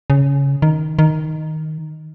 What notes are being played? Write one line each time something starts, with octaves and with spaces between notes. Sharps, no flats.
C#3
D#3
D#3